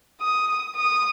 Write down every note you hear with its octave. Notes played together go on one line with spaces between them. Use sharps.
D#6
D#6